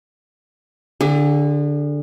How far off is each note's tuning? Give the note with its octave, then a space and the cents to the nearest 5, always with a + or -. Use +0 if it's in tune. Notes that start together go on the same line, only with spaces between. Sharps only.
D3 +0 G#4 -40